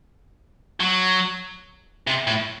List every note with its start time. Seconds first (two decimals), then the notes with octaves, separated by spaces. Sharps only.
0.80 F#3
2.07 C3
2.27 A2